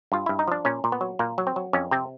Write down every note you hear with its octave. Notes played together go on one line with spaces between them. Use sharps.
G2 F4
G2 E4
D#4
F3 D4
A#2 C#4
A#2
B3
F#3
A#2 A#3
F#3
C4
F#3
F2 C#4
C3 C4